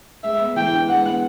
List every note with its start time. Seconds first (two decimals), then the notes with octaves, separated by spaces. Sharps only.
0.24 G#3 E5
0.40 B3
0.56 E3 G5
0.73 D4
0.89 G#3 F#5
1.05 B3